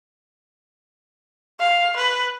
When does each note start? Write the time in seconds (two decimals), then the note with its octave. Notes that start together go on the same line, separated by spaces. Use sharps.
1.60 F5
1.96 B4